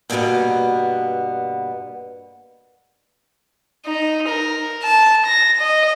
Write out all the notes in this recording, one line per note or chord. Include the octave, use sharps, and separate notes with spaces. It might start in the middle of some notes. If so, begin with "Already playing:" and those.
G2 B2 D3 G#3 A#3 B3
D#4
A#4
A5
A#6
D#5